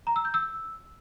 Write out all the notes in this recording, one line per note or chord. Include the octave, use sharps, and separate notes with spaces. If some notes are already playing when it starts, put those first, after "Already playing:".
A#5
E6
G6
E6